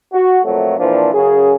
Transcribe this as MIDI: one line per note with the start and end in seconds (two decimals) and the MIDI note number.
0.13 0.39 66
0.44 0.77 41
0.44 0.77 46
0.44 0.77 54
0.44 0.77 57
0.78 1.09 46
0.78 1.09 52
0.78 1.09 53
0.78 1.09 60
0.78 1.09 62
1.13 1.55 42
1.13 1.55 49
1.13 1.55 68